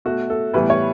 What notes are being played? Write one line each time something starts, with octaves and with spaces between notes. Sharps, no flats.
B2 A3 F#4
A4
A2 E3 G3 B3 B4
C#5